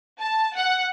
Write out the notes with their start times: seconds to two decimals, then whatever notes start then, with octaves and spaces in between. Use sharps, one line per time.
0.20 A5
0.56 F#5